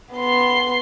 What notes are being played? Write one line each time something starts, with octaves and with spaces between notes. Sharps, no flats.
B3 C6